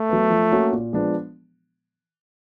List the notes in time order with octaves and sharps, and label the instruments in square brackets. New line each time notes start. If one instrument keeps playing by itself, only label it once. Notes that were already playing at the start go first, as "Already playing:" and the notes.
Already playing: [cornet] A3
[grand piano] F#3 B3
F3
A#3 C#4 F#4
A#2
F3 G#3 B3 D4